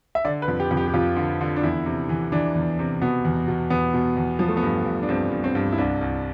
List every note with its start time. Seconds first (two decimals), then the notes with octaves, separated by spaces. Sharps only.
0.15 E5
0.25 D3 D5
0.42 B4
0.48 F2
0.60 G4
0.71 F2
0.77 G4
0.88 G4
0.94 F2 F4
1.17 D3
1.41 D3
1.56 D4
1.63 E2 E4
1.86 C3
2.09 E3
2.32 E3 D4
2.55 E2
2.79 C3
3.02 B2 B3
3.25 E2
3.48 B2
3.70 E2 B3
3.94 B2
4.17 E2
4.39 F3 B3
4.48 A3
4.57 B3
4.63 G2
4.86 G2
5.03 D4
5.09 G2 C4
5.32 G2
5.44 C4
5.55 G2
5.73 E4
5.78 C2 D4
6.01 C2